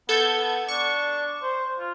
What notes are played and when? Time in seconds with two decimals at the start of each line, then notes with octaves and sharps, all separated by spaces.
0.09 B3 A4 G6 G#6
0.68 D4 C#6
1.42 C5
1.79 F4